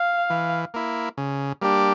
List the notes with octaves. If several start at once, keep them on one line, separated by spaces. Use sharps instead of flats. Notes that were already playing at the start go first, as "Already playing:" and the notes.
Already playing: F5
E3
A#3 E4
C#3
G3 A#3 D4 G4